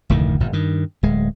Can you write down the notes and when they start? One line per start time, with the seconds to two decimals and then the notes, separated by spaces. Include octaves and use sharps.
0.10 F1 D2 A2 D#3
0.40 G1 A#2
0.53 G2 D#3
1.03 D1 G#3